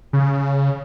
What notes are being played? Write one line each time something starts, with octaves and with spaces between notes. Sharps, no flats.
C#3